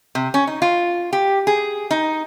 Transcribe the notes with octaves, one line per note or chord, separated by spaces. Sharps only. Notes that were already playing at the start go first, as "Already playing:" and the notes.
C3
C#4
D#4
F4
G4
G#4
D#4